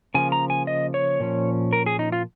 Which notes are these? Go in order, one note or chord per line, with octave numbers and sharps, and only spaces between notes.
C#3 F3 A#3 G#5
A#5
G#5
D#5
C#5
A#2 F3 C#4
A#4
G#4
D#4
F4